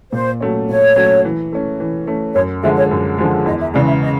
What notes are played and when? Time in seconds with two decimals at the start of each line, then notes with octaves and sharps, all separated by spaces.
0.12 A#2 C5
0.40 F#3 A3 C#4
0.69 A#2 C#5
0.96 F#3 A3 C#4
1.25 E3
1.52 A3 C#4
1.80 E3
2.07 A3 C#4
2.35 F#2 C#5
2.62 D3 F3 G#3 E5
2.77 C#5
2.91 F#2
3.18 D3 F3 G#3
3.46 E2 D#5
3.61 E5
3.74 C#3 E3 G#3 D5
3.87 E5
4.02 D#5